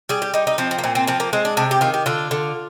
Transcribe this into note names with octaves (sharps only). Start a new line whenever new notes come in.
G3 G#4
G4
G3 D#4
D#4
F3 C4
C4
A#3
A#2 C4
C4
F3 C4
A#3
G#3 C4
D4
C3 D4
G4
D#3 F4
G4
D3 F4
D3